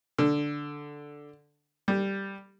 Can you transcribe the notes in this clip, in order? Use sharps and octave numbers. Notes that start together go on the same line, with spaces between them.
D3
G3